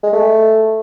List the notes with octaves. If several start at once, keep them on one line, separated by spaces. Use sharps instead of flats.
G#3
A3